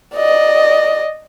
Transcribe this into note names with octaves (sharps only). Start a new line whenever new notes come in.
D5 D#5